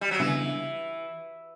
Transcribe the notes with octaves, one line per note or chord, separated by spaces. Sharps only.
G3
F#3
C#3 E3 G3 B3 D4